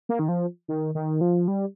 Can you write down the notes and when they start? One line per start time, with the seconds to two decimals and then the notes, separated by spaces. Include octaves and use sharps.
0.09 A#3
0.19 D#3
0.29 F3
0.68 D#3
0.95 D#3
1.21 F3
1.48 G3